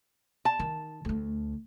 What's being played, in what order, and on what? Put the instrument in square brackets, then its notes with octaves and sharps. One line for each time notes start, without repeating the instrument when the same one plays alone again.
[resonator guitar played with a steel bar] A5
[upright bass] D#3
D2 A3